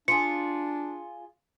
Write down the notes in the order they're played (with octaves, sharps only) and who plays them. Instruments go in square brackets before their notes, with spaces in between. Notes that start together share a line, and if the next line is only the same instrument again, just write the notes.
[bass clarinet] D4 [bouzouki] F4 G#4 [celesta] C#7